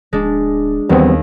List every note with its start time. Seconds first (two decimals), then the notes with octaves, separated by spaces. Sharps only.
0.13 D1 G#3 D4
0.89 D#2 E3 G3 B3 C4